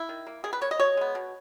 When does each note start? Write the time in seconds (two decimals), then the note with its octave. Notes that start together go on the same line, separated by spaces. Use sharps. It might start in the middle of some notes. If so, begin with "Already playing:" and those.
Already playing: E4
0.09 D#3
0.27 A#3
0.44 D#3 G#4
0.53 B4
0.61 A#3 C#5
0.71 D#5
0.80 B2 C#5
0.97 G#3 B3
1.15 B2